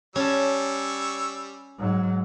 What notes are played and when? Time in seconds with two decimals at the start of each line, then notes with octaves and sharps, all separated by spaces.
0.16 G3 C#4 C#5 A5 E6
1.79 G#2 F#3